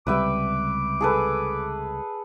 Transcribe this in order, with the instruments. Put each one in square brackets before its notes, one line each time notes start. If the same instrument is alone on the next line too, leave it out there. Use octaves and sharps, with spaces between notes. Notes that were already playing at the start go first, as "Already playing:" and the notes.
[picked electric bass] C#2 C3 G3 [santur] B4 E5 G5 [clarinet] D6
[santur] G#4 A4 B4